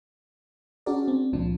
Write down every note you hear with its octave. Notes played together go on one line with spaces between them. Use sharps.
C#4 D4 F#4 G#4 A#4 D5
C4
C#2 A#2 F3 D4